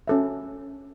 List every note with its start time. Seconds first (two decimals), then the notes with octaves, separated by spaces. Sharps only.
0.08 C#4 F#4 A4 E5